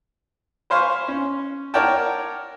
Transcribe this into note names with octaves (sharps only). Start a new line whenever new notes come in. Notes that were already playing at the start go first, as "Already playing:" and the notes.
B4 C5 F5 G#5 C6 C#6
C#4
A#4 C#5 D5 F#5 G5 A5